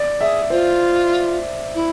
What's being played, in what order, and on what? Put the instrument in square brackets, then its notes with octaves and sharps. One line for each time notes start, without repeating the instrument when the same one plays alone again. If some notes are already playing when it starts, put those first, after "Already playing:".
Already playing: [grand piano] D5
[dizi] G#4 [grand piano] E5
[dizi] F4 [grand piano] C5
[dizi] E4